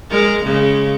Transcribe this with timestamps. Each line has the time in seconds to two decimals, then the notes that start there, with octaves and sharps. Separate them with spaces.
0.10 G#3 A#4
0.44 C#3 G#3